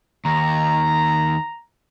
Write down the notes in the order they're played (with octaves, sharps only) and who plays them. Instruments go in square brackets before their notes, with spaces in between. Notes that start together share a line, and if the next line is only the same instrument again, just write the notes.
[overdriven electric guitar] D#2 [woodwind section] A#5